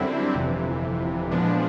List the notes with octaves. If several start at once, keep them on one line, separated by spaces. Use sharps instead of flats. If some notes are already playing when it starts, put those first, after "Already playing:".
Already playing: F#2 D3 G3 C4 E4
G1 F2 C3 E3
A#2 F3 G#3 B3 D4